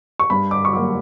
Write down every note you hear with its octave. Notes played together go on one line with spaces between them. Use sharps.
C#6
G2 B5
D6
C#6
F#3 A#3 D6